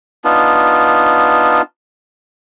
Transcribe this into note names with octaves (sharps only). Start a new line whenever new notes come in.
B3 D4 D#4 F4